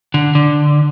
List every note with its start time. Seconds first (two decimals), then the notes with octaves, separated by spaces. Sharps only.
0.14 D3
0.35 D3